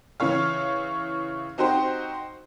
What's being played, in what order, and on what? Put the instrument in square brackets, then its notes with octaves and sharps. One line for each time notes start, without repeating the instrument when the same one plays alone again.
[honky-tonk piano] C#3 E3 C#5 F5
C4 D#4 F#4 G4 C5